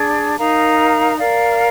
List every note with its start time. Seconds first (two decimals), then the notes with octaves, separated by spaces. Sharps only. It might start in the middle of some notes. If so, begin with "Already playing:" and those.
Already playing: D4 G#4 D5
0.38 D#4 A#4 F5 A#5
1.18 A#4 D5 F5